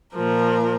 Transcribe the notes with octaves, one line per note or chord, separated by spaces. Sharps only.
A#2 F3 A#4